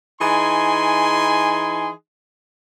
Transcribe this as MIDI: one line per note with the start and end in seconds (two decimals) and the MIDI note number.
0.20 1.90 52
0.20 1.90 63
0.20 1.90 68
0.20 1.90 80
0.20 1.90 84